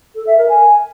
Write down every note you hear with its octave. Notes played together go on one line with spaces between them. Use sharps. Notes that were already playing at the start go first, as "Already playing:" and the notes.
A4
E5
A#4
G#5